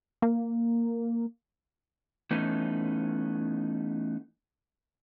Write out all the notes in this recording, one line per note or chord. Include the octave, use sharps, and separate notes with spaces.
A#3
E3 A3 B3 C#4 D#4